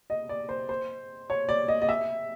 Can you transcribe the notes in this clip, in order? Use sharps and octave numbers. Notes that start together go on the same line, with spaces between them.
D#5
D5
C5
C5
C#5
D5
D#5
D#5
E5